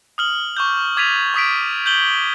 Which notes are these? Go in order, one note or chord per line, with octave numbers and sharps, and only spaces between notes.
D#6 F6 F#7
C#6 D6 G6
D6 G#6 A6 B6 D#7 F7
C#6 D#6 B6 D7
G6 F#7 G7